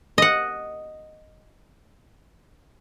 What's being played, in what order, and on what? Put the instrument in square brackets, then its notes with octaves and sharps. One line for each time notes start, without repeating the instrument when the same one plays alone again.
[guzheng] D#5 F#5